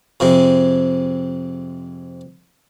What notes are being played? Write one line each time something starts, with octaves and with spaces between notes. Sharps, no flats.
F2 C3 G#3